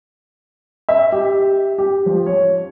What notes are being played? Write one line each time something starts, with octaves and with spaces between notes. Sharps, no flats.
E5
G4
G4
F3
C#5